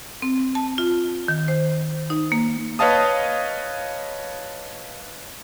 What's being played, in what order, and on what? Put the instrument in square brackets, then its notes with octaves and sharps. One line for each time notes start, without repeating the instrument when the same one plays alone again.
[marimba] C4
A5
F4
D#3
C5
D#4
A#3
[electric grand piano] B4 C#5 D#5 F5 A5 D#6